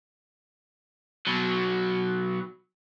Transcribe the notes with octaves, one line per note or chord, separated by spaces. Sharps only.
B2 F#3